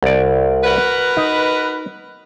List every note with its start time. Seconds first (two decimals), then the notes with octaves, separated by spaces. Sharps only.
0.02 C2 D5
0.64 F#4 A#4 B4
1.17 D#4